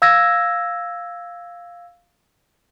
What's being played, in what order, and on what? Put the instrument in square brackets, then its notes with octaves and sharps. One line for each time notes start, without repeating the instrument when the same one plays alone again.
[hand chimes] F5 E6 G#6 A#6